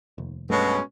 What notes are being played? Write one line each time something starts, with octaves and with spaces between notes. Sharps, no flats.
F1 D#2
B1 G2 B2 G#3 A3 C#4